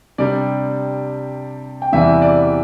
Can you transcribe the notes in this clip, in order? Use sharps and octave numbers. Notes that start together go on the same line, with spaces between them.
C3 G3 D4 D5
G5
E2 C3 E3 G3 E5
D5